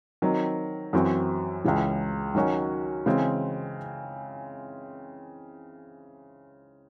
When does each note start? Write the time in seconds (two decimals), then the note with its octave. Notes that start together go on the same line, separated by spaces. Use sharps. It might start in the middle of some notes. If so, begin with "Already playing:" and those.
0.22 D#3 F#3 C4
0.93 F#2 E3 C4 F#4
1.64 C#2 C#3 E3
2.35 D#3 F#3 C#4 F#4
3.06 C#3 E3 G#3 C4